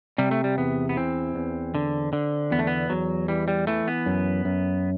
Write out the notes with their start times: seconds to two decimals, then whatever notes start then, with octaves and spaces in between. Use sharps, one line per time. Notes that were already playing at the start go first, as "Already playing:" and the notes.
0.18 C3 G3
0.31 A3
0.44 G3
0.57 E2 B3
0.89 B3
0.97 E3 C4
1.35 E2
1.75 D3
2.13 D3
2.51 E2 B3
2.59 A3
2.67 B3
2.90 E2 F#3
3.28 E3 G3
3.48 G3
3.67 E3 A3
3.88 B3
4.06 F#2
4.45 F#2